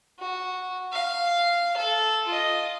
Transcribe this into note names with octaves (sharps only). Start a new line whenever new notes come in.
F#4
F5
A4
F4 D#5